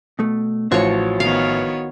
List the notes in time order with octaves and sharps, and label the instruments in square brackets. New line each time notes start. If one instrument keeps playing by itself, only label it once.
[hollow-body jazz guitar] B2 A3
[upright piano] A1 F3 [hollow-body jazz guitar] F#4 C5 [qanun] C#5 C#6
[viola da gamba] D#3 B3 C#5 [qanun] F5